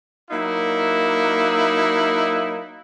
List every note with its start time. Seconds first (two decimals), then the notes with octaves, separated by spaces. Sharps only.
0.31 F#3 A#3 D#4 E4